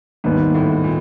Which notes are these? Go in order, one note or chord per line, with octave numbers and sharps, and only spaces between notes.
D#2 G#2 D#3 G3 B3
A2
A#2